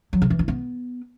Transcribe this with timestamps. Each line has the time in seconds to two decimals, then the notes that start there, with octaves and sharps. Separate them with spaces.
0.13 F#3
0.22 C#3
0.30 E3
0.39 E4
0.48 B3